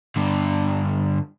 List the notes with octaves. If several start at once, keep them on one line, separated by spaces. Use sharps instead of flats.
G2 D3